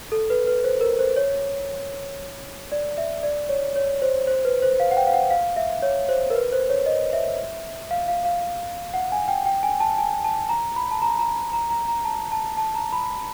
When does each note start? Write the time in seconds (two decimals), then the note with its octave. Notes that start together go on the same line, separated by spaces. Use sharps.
0.12 A4
0.30 B4
0.47 B4
0.64 C5
0.81 A#4
0.99 C5
1.16 C#5
2.72 D5
2.98 E5
3.23 D5
3.49 C#5
3.76 C#5
4.02 C5
4.27 C5
4.45 B4
4.62 C5
4.80 F5
4.91 F#5
4.97 G5
5.07 F5
5.13 F#5
5.30 F5
5.56 E5
5.82 C#5
6.09 C5
6.30 A#4
6.35 B4
6.52 C5
6.70 C#5
6.86 D#5
7.13 E5
7.91 F5
8.08 F5
8.25 F5
8.94 F#5
9.12 G#5
9.28 G5
9.46 G5
9.63 G#5
9.80 A5
9.98 G#5
10.24 A5
10.49 A#5
10.76 B5
10.91 A5
11.02 A#5
11.19 A#5
11.53 A#5
11.70 A#5
11.88 A#5
12.05 A5
12.32 A5
12.57 A5
12.75 A#5
12.92 B5